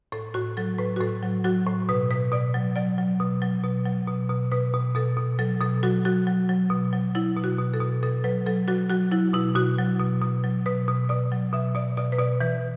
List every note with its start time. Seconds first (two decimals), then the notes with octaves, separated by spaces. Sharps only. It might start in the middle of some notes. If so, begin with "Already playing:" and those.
0.12 A2 A4
0.34 A2 F#4
0.57 F#3 A4
0.78 A2 B4
0.96 F#4
1.00 A2 A4
1.22 F#3
1.45 F#3 F#4
1.66 A2
1.89 B2 B4
2.10 B2 B4
2.32 B2 D5
2.54 F#3
2.76 F#3 D5
2.98 F#3
3.20 B2
3.42 F#3
3.64 B2
3.86 F#3
4.07 B2
4.29 B2
4.52 B2 B4
4.74 B2
4.95 B2 A4
5.17 B2
5.39 F#3 A4
5.61 B2 A4
5.83 F#3 F#4
6.05 F#3 F#4
6.27 F#3
6.49 F#3
6.70 B2
6.93 F#3
7.15 F#3 E4
7.37 B2
7.44 F#4
7.59 B2
7.74 A4
7.80 B2
8.03 B2 A4
8.24 F#3 B4
8.46 F#3 A4
8.68 F#3 F#4
8.90 F#3 F#4
9.12 F#3 E4
9.33 B2 E4
9.55 B2 F#4
9.78 F#3
9.99 B2
10.22 B2
10.44 F#3
10.66 B2 B4
10.88 B2
11.09 B2 D5
11.32 F#3
11.53 B2 E5
11.75 B2 D5
11.97 B2 D5
12.12 B4
12.18 B2 D5
12.41 E3 B4